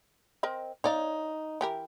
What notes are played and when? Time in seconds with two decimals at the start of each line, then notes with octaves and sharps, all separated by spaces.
0.43 C4 A#4 D#5
0.84 D#4 C#5 D5 F5
1.61 E3 G4 A#4